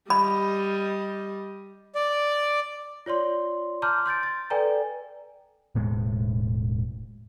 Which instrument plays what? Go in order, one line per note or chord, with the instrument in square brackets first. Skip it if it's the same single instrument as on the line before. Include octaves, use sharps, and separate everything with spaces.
[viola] G3 D#5 [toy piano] B5
[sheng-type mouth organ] D5
[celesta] F4 C#5 D5 C6
A5 A#5 C6 D6 F6 G6
C6 G6 A6 D7
A6
A4 B4 D5 G5 G#5 A#5
[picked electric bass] E1 A2 G#3